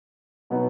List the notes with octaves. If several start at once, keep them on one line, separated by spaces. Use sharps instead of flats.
B2 F#3 B3 D#4